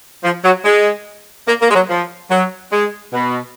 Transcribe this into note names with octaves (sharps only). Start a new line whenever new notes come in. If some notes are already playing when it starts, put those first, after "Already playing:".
F3
F#3
G#3
A#3
A#3
G#3
F#3
F3
F#3
G#3
B2